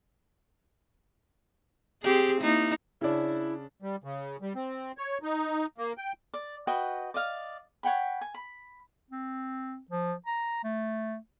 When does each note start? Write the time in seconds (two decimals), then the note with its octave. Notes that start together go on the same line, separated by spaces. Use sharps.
2.03 C4 G4 G#4
2.41 A#3 D#4 E4
3.01 C#3 C#4 D4 E4
3.82 G3
4.04 C#3
4.42 G3
4.55 C4
4.98 C#5
5.23 D#4
5.78 A#3
5.98 G5
6.34 D5
6.67 F#4 B4 D#5 G5
7.14 D5 D#5 F5
7.83 C#5 F#5 G5 B5
8.21 G#5
8.34 B5
9.11 C4
9.91 F3
10.27 A#5
10.64 A3